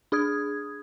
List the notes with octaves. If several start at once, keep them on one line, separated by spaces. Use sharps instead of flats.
D4 G#4 D#6 G#6